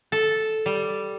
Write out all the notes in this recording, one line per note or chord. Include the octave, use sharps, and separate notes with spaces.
A4
G3